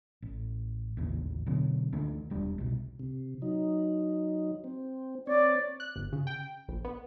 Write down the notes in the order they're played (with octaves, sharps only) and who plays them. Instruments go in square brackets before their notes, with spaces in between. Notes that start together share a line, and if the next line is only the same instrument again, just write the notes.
[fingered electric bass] A1
A1 D#2 C#3 E3
B2 D3 F#3
D2 D3 E3 A3
E1 G3 D4
C2 B2
[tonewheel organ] C3
F#3 D#4
C4
[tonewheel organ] C4 C#5 [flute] D5
[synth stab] F#6
G1
C#3
G5
A#1
B3